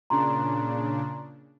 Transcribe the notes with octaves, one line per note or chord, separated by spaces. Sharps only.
A#2 C#3 D4 A#5 C6